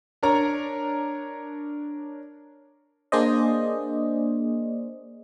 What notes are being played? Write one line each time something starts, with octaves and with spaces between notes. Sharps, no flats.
D4 A#4 C#5 A#5
A#3 D4 G#4 C5 D5 D#5